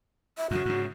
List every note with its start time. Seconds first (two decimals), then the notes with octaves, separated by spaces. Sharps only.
0.37 E5
0.51 F#2 C#3 F#4
0.66 G#2 C#3